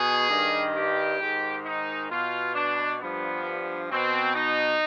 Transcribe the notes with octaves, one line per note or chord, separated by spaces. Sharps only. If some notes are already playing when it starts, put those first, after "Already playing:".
Already playing: B2 G#4
G2 D#3
G4
G#2 D#3
D#4
B2 F4
D4
G2 F3 B3
B2 C4
D#4